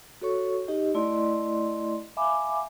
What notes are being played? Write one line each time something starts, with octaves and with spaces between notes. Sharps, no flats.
F#4 A4 C#5 C#6
D#4 G4 D#5
A3 E4 D5 D#5 C6
E5 F5 G#5 B5 D6